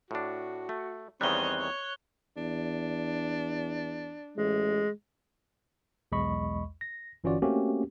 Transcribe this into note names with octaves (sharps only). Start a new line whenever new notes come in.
A2 D4 F#4
A3
E2 D#3 G3 C4 C#5 D#5 F#6 G7
C#5
E2 D4
A1 G#3
B1 E2 G#3 D#5 B5 C#6
A#6
G1 E3 C#4 F4 F#4 D5
A3 A#3 C4 C#4 F#4 G4